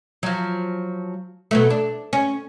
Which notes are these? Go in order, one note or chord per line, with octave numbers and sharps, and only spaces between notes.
F3 F#3
B2 F#3 A3
D4
C#4